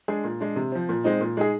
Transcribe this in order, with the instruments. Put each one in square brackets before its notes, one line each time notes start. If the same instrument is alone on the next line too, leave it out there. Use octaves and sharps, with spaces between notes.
[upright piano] G#3 D4 G#4
A#2
G#3 D4
C3
F3 C4
A#2
G#3 C4 D#4
A#2
G#3 D#4 G#4